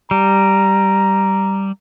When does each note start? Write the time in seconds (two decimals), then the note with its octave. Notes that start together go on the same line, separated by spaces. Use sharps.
0.11 G3 A#5